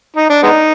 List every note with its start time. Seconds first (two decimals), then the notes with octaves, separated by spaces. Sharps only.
0.16 D#4
0.30 D4
0.43 G#3 B3 D#4